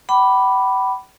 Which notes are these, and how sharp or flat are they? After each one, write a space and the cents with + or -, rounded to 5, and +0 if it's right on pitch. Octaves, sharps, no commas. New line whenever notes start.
G5 -45 B5 +0 D6 +0